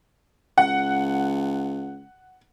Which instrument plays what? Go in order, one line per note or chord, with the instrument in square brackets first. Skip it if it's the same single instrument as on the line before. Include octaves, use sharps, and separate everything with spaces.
[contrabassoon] C#2 [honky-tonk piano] F#5